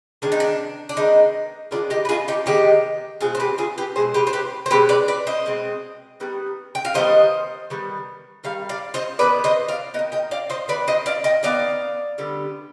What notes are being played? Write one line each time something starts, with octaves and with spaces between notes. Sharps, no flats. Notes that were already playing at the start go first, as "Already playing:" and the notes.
D#3 G#3 B3 D4
D#4
D4
D4
D#3 G#3 B3 D#4
D#3 G#3 B3 D4 F4
D#4 G4
B4
F4 G#4
D#4 G4
D#3 G#3 B3 D#4 G4
B2 G#3 C4 F4 G#4
C5
G4 B4
F4 G#4
G4 B4
B2 G#3 C4 G#4 C5
G4 B4
C5
G4 B4
C5
B2 G#3 C4 G4 B4
B4 D5
B4 D5
C5 D#5
B2 G#3 C4
D#3 G3 B3
G5
F5
D#3 G3 B3 C5 D#5
D#3 G3 B3
D#3 G3 F5
D5 F5
C5 D#5
D#3 B3 B4 D5
C5 D#5
D5 F5
B3 D#5 G5
D#3
D#5 G5
D5 F5
C5 D#5
D#3 B3 B4 D5
C5 D#5
D5 F5
D#5 G5
D#3 B3 D5 F5
D3 G3 B3